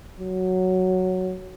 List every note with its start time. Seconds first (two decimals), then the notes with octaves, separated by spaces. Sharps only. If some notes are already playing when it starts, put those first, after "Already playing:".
0.20 F#3